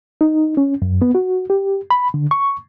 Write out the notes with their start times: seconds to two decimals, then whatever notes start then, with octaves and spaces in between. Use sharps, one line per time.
0.21 D#4
0.57 C#4
0.82 F#2
1.02 B3
1.15 F#4
1.50 G4
1.91 B5
2.14 D3
2.31 C#6